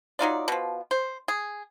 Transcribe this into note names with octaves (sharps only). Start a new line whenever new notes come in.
F#3 D#4 F4 D5
B2 F3
C5
G#4